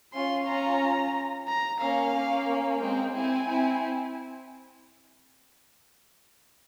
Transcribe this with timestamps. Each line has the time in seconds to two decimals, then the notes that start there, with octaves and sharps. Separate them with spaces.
0.13 C#4 F4 C6
0.47 C#4 F4 A#5
1.48 A#5
1.80 A#3 C#4 F5
2.14 A#3 C#4
2.80 G#3 C4 G5
3.14 C4 E4 G#5
3.48 C4 E4